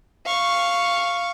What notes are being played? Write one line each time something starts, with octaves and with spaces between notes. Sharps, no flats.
F5 C#6